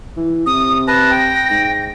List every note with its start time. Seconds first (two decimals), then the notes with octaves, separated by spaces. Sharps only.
0.17 E3
0.46 C3 D#6
0.88 B4 A5 A#6
1.12 G5
1.50 G#2